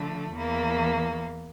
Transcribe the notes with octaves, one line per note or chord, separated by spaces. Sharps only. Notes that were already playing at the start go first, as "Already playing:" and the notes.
Already playing: D3 F3 A3
E2 E3 A#3